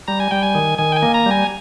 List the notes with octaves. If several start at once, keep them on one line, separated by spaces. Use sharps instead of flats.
G3 A#5
G#5
G3 G5
G#5
D#3
D#3 G#5
G5
G#5
A#3
A#5
G3 G#5